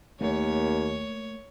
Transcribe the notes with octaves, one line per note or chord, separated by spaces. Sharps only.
D#2 A3 A#3 C#5